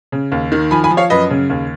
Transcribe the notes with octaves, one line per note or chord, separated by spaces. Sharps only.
C#3
D#2
D#3
F3 G#5 B5
G#5 B5
F3
C#5 F5
F#2 B4 D#5
C#3
D#2